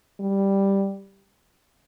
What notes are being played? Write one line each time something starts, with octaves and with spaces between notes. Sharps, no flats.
G3